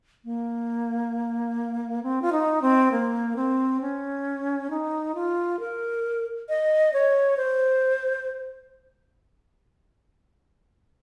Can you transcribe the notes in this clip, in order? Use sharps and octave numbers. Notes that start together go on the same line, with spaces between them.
A#3
C4
F4
D#4
C4
A#3
C4
C#4
D#4
F4
A#4
D#5
C#5
C5